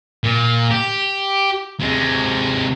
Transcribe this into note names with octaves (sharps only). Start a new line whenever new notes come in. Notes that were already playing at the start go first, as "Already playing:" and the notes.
A#2
G4
C3 G#3